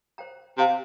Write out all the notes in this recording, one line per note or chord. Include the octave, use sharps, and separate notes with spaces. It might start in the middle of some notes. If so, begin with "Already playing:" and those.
C5 G5 A#5
C3 C5 F5 A#5